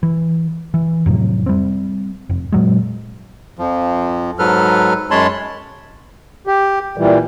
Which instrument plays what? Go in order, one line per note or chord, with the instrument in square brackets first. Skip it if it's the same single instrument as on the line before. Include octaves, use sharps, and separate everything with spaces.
[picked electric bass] E3
E3
F2 A2 C3 F#3
G3 C4
F1
A#2 F#3 G#3
[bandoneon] F2 F3
G#2 F#3 A4 B4 F6
F#2 G#3 C#5 A5 B5 C6
[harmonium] G4
A#2 E3 G3